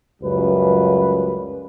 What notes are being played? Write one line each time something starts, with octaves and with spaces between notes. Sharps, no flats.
C#2 F#2 G3 B4